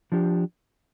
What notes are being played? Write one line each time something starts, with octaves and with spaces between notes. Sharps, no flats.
F3 D4 G4